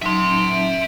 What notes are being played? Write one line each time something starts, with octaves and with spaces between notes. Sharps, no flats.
F#3 D#4 E5 A5 C6